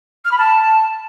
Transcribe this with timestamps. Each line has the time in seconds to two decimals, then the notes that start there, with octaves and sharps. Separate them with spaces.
0.24 F6
0.31 B5
0.38 A5